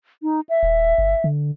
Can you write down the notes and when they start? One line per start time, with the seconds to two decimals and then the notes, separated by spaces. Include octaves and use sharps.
0.23 D#4
0.49 E5
0.63 D#1
0.98 G1
1.24 D3